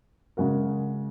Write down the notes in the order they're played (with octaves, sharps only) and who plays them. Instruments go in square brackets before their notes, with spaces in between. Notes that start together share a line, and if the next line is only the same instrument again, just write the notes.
[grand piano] C#3 G#3 F#4 A#4